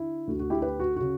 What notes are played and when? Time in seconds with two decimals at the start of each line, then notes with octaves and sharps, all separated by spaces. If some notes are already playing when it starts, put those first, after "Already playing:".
Already playing: D3 E4
0.27 D2 F#4
0.31 D3
0.39 F#4
0.50 E4 G4
0.62 G4 B4
0.80 F#4
0.96 C#3 F#4